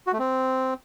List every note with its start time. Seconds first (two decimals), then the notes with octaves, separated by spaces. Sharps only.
0.07 F#4
0.13 A3
0.19 C4